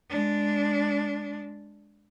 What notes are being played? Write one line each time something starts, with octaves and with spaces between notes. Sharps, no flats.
G#3 D4